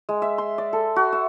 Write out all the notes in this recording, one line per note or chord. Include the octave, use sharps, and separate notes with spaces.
G#3
E5
C6
D5
A4
F#4
E5